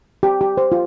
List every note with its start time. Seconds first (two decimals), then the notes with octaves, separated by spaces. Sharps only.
0.23 G4
0.41 G4
0.57 C5
0.72 F4